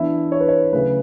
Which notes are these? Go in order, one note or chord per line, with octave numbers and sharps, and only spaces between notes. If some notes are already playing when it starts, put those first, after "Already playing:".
Already playing: E3 B3 D4 E4 E5
C#5
B4
C#5
C#3 F#3 A3 B4